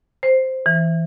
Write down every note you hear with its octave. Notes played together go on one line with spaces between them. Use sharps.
C5
E3